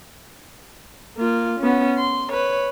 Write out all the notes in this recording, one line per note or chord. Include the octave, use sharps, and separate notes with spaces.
A#3 F4
B3 C#4
C6
B4 C#5